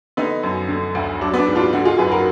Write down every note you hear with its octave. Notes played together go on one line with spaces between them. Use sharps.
D3 B3 D#4
F#2
D3
D2
F#3 D4
B3
D4
G#2
D4 F4
D3 D#4 F#4
F4 G#4
F#2 G#4 B4
F#4 A#4